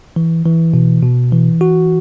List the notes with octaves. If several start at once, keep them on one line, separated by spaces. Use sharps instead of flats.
E3
E3
B2
B2
E3
F#4